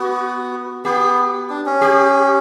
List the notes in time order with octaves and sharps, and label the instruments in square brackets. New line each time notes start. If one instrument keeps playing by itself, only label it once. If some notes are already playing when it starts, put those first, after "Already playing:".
Already playing: [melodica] B3 [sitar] F#4
[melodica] B3 [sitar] G4
[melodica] D4
C#4
[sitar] G4